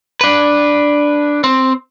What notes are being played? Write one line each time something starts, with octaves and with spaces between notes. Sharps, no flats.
D4 B4
C4